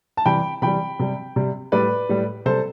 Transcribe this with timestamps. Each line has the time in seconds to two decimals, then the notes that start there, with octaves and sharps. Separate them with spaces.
0.17 A5
0.26 C3 E3 G3 G5 B5
0.62 C3 E3 G3 G5 B5
0.99 C3 G3
1.36 C3 G3
1.72 A2 G3 B4 D5
2.09 A2 G3
2.46 C3 G3 A4 C5